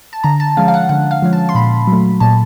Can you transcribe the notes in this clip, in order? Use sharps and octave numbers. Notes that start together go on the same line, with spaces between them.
A5
D3 A#5
A5
F3 G#3 C#4 F5
F5
F#5
D3 F#5
F5
F3 G#3 C#4
A5
C6
A#2 B5
F#3 A3
A#2 A5